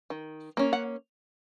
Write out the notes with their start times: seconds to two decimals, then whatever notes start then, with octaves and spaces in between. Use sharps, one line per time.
0.10 D#3
0.57 A#3 C#4
0.73 F#5